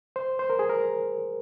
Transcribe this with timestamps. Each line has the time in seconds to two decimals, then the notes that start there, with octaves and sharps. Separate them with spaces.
0.16 C5
0.39 C5
0.50 A#4
0.59 G#4
0.70 A#4